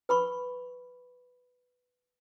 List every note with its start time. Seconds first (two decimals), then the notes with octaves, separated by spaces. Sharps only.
0.09 B4 B5 C#6